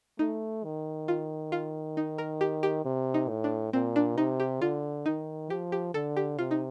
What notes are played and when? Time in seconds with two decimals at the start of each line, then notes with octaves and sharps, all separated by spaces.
0.19 A3 D#4
0.64 D#3
1.08 F4
1.52 F4
1.97 D#4
2.18 A#4
2.41 G4
2.63 G4
2.85 C3
3.14 D#4
3.29 A2
3.44 D4
3.73 A#2 C4
3.96 D4
4.17 C3 D#4
4.40 G4
4.61 D3 F4
5.06 D#3 D#4
5.50 F3 G4
5.72 G4
5.94 D3 A4
6.16 G4
6.38 C3 F4
6.51 D#4